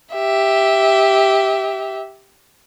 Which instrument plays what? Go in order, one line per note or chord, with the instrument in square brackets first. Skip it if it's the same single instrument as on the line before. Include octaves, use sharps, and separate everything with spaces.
[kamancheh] G4 E5